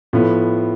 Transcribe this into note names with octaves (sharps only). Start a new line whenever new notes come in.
A2 F3 B3